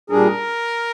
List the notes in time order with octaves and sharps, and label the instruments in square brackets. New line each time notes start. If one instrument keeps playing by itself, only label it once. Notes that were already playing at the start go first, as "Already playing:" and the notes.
[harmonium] A#2 G3 D4 G#4 [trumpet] A#4